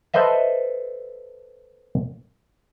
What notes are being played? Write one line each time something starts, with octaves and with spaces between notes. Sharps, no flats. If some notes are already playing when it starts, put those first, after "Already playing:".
A4 B4 C5 D#5 E5